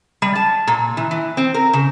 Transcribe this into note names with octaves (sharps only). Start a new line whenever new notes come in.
G3
A5
A#2
E3
E3
C4
A#4
C#3